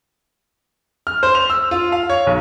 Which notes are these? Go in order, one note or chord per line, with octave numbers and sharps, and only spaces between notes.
F6
C5
F7
E6
F4
F5
C#5
B1